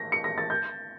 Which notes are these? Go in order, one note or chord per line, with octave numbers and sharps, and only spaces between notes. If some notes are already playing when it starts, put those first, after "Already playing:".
Already playing: A#6
C#7
A#6
A6
G6